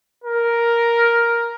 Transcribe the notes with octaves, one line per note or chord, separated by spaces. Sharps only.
A#4